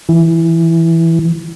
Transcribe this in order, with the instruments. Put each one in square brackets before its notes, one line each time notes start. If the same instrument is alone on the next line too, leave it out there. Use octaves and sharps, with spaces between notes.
[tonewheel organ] E3